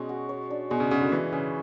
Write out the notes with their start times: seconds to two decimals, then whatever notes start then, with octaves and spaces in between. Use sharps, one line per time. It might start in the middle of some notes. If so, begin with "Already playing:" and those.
Already playing: B2 G#3 C#4
0.09 F#4
0.29 C#5
0.50 D4
0.70 B2 G#3
0.80 C#3
0.91 C#3 F#4
1.01 D3
1.12 E3 B4
1.32 C#3 C#4